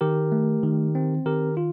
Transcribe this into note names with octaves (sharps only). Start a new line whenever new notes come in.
D#3 G4 A#4
A3
D#3
C4
D#3 G4 A#4
F4